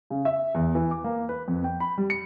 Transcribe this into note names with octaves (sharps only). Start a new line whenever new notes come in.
C#3
E5
E2
E3
D6
A#3
B4
F2
G5
B5
G3
C#7